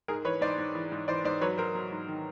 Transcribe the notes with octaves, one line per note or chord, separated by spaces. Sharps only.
G#2 G#4 A#4
E3 B4 C#5
G#2 C5 D5
G#2
E3
G#2
E3 C5 D5
G#2 C5 D5
F#3 B4 C#5
F#3 A#4 C5
F#3
G#2
D#3